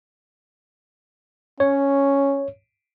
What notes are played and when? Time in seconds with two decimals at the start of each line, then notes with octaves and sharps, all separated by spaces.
1.60 C#4 C#5